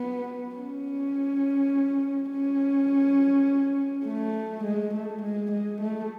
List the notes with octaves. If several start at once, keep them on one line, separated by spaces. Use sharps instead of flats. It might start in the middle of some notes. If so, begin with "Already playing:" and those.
Already playing: B3
C#4
C#4
A3
G#3
A3
G#3
G#3
A3